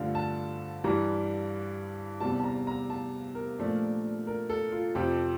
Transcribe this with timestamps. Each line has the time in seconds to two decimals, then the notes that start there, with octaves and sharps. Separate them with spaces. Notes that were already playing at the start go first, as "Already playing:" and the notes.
Already playing: G2 D3 F3 A3 D4 F5
0.15 A5
0.84 G2 E3 G3 D4 A#5
2.20 E2 C3 G3 A5
2.40 A5
2.44 A#5
2.67 A#5
2.90 A5
3.35 A#4
3.59 A#2 F3 A3 D4
4.27 A#4
4.50 A4
4.72 F4
4.95 F2 C3 F3 G4